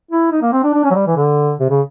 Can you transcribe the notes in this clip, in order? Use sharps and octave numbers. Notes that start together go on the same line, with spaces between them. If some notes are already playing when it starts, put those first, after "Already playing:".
E4
D#4
A#3
C4
D4
D4
C#4
F#3
G3
E3
D3
C3
C#3